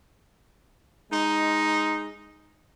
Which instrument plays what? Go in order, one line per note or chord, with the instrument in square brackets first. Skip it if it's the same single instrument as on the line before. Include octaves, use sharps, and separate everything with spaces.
[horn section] G#3 D#4